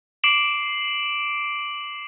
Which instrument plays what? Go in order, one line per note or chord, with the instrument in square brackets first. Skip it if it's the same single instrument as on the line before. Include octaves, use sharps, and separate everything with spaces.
[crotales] D6 C7 D7 E7 F#7